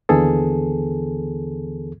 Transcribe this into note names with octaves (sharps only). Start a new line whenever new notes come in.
D#2 D3 E3 B3 G#4 A4